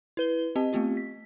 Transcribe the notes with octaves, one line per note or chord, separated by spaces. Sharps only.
E4 B4 G7
C4 G4 D#5 A5
A3 B3 C4 F4 G4
B6